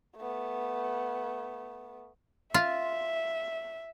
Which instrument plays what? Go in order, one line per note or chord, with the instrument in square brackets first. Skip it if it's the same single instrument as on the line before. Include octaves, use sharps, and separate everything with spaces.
[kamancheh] A3 B3
[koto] F4 [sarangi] E5